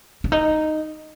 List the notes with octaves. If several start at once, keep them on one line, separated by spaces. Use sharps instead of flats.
D4
D#4